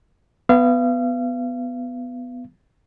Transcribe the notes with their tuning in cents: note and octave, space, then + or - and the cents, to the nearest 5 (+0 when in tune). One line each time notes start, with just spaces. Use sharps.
B3 +10 F5 -35